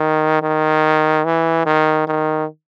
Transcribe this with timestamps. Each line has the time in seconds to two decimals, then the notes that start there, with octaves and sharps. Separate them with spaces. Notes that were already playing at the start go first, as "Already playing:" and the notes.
Already playing: D#3
0.42 D#3
1.25 E3
1.66 D#3
2.07 D#3